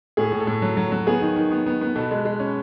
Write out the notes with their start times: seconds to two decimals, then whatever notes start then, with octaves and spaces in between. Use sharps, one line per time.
0.17 A2 G#4
0.32 A2
0.40 A4
0.47 A2
0.62 F#3
0.77 F#3
0.92 F#3
1.07 B3 G#4
1.21 D#3
1.36 D#3
1.51 B3
1.66 B3
1.81 B3
1.95 B2 A4
2.11 G#3
2.25 G#3
2.40 C#4